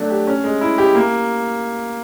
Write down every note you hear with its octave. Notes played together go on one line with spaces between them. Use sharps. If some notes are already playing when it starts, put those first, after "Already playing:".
Already playing: F#3 A3 D4
G4
C#4
G#3
E4
G4
A#3